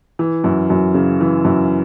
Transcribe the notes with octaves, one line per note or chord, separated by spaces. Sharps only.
E3
F#2
F#2
C#3
E3
F#2